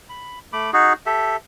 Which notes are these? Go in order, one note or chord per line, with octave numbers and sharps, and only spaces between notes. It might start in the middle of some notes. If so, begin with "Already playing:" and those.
B5
A3 B5 D6
D#4 F#4 G#4
G4 A4 E5